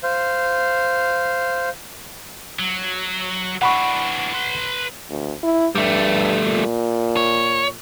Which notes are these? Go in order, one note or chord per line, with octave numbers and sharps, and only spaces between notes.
C5 F5
F#3
E3 D4 F#5 B5 C#6
B4 C6
D2
E4
G2 G3 A3
A#2
C#5